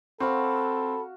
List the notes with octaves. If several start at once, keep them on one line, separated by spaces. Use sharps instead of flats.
C4 F#4 A4 F5 B5